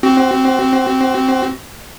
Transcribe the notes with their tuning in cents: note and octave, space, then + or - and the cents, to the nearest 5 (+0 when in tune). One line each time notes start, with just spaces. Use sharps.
C4 +0 F#4 +30